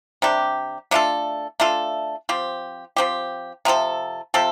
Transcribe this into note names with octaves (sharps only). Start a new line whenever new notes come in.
C3 G3 D4 G4
A3 D4 F4 A4
A3 D4 F4 A4
F3 C4 G4
F3 C4 G4
C3 F3 C4 A4
C3 F3 C4 A4